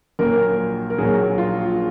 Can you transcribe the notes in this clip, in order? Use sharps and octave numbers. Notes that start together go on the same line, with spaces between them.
A#1 A#2 F#3 A#4
A#4
A#1 A#2 F#3 G#4
F4